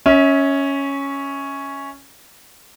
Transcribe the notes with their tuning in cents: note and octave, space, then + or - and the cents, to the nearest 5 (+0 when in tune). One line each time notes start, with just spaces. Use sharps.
C#4 +0 E5 -40